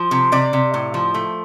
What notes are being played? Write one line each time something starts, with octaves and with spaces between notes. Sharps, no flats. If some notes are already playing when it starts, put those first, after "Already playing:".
Already playing: F3
C3
C3 D5
C3
A2
F3
A3